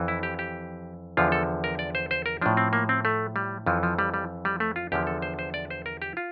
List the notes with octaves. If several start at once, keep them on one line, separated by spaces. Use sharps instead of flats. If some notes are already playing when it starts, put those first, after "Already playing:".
Already playing: F2 E3
E4
G4
G4
E2 D3 F3 F4
A4
A#4
D5
C5
C5
A#4
A2 F3 D4
C4
A#3
C4
A3
G3
F2 E3 F3
F3
G3
G3
G3
A3
F4
E2 D3 F3 G4
A4
C5
C5
D5
C5
A#4
G4
F4